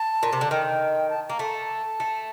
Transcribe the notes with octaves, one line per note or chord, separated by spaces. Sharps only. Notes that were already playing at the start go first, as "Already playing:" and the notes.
Already playing: A5
A#2
C3
D3
D#3 G5
A5
A#3 A#5
A3 A5
A3